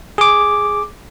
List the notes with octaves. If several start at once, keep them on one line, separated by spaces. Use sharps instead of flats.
G#4 D6